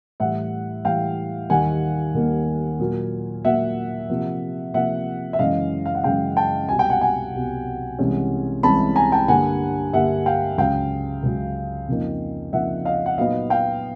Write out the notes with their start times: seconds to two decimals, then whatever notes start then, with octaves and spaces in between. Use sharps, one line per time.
0.20 A2 E3 G3 E5 F#5
0.85 A2 E3 G3 F5 G5
1.50 D#2 D#3 G3 A#3 F#5 G#5
2.15 D#2 D#3 G3 A#3
2.79 A#2 F#3 A#3
3.44 A#2 F#3 A#3 E5 F#5
4.10 C3 F3 A#3
4.74 C3 F3 A#3 E5 F#5
5.33 E5
5.39 F#2 C#3 E3 G#3 C#4 D#5 F5
5.86 F5
5.95 F#5
6.04 F#2 C#3 E3 G#3 C#4 F5 G5
6.37 G5 A5
6.69 C2 B2 G3 G#5
6.79 G5
6.90 F#5 G#5
7.01 F#5 G#5
7.33 C2 B2 G3
7.99 C2 C3 E3 G#3 C#4
8.63 C2 C3 E3 G#3 C#4 A5 B5
8.96 G#5 A#5
9.12 G5 A5
9.28 G2 D3 G3 A#3 D4 F#5 G#5
9.93 G2 D3 G3 A#3 D4 E5 F#5
10.26 F5 G5
10.58 C#2 C#3 F#3 F5 G5
11.23 C#2 C#3 F#3
11.88 F2 C#3 F3 A#3 D#4
12.53 F2 C#3 F3 A#3 D#4 E5 F#5
12.85 D#5 F5
13.06 F#5
13.18 A#2 F#3 B3 D#4 D#5 F5
13.50 F5 G5